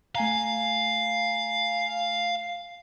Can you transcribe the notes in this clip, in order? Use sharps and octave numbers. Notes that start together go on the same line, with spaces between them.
A3 F5 G#5 A#5